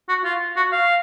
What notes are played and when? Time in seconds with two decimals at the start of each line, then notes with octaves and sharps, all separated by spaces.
0.09 F#4
0.24 F4
0.57 F#4
0.72 F5